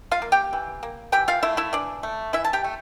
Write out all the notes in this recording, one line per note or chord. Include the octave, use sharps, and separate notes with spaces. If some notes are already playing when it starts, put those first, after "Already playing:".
F4 F5
A#3
G4 G5
E3
A#3
E3 G4 G5
F4 F5
A3 E4 E5
E4 E5
E3 D4 D5
A3
E3 E4 E5
A5
G4 G5
A3